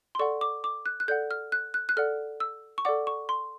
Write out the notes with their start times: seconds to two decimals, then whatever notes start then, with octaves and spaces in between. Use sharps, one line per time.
0.15 C6
0.19 A4 D5 F#5 C#6
0.41 D6
0.64 D6
0.86 F#6
1.00 F#6
1.08 A4 D5 F#5 G6
1.31 F6
1.52 F#6
1.74 F#6
1.89 F#6
1.97 A4 D5 F#5 F6
2.40 E6
2.78 C#6
2.85 A4 D5 F#5 D6
3.07 C#6
3.29 C6